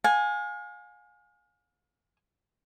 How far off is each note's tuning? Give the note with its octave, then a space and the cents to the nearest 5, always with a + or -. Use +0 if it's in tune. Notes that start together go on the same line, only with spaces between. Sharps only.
F5 +40 G#5 +0